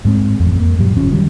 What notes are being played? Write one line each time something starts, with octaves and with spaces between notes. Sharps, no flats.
G#2 G#3 C4
A1 F2
A#3
G2 A#2 F#3 G3
F#1 F3 C#4
D#3 F#3 G3